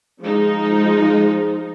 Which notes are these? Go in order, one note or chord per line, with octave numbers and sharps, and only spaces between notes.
F3 G#3 D#4